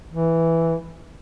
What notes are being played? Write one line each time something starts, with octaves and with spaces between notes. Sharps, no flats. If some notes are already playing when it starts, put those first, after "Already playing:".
E3